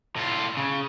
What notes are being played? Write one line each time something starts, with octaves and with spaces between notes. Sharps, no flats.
A2 F4
C#3